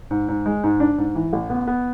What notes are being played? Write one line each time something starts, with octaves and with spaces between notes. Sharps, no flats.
G#2
G#2
G#3
G#2
D4
G#2
E3
A1
B3
B3